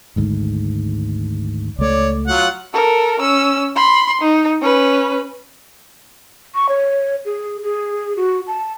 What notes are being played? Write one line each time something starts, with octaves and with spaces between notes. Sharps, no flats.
G#1 D2 G#2
C#2 A3 C#5 D5
F#3 F4 F#5
A4 A#4
C#4 E6
B5 C6
D#4
C#4 B4
C#6
C#5
G#4
G#4
F#4
A5